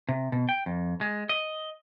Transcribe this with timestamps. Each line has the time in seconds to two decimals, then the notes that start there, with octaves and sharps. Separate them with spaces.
0.09 C3
0.32 B2
0.49 G5
0.66 F2
1.01 G#3
1.29 D#5